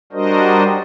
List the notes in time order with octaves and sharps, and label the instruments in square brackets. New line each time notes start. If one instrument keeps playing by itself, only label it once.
[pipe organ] G3 D4 F#4 A#4 C5 D#5